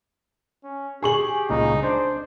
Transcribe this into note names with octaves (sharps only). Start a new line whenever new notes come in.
C#4
G4 G#4 C#6 F#7
C#2 A#2 C#3 D#4
D4 C5 D5